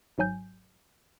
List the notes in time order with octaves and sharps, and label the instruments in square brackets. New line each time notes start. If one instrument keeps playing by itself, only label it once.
[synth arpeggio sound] G#1 G#2 F#3 G#5 G6